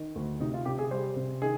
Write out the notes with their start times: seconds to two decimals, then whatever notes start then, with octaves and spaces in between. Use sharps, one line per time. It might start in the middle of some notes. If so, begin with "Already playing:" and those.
Already playing: D#3
0.16 D2
0.40 C3 D#4
0.54 F4
0.65 C3 G4
0.79 G#4
0.91 G3 C5
1.16 C3
1.42 D#3 G#4